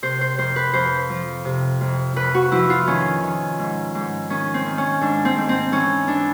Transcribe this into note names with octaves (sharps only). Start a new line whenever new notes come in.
C3 C5
C5
F2 C5
B4
F2 C5
F3
C3
F2
F2 B4
F#4
F3 E4
F4
D#3 C#4
D#3
G#2
G#2
D#3 C#4
C4
D#3
C#4
G#2 D4
C4
G#2
C4
E3 C#4
E3 D4